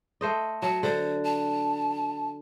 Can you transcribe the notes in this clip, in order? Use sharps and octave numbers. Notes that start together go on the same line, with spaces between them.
A3 C5 D#5
F#3 A5
D3 C5
A5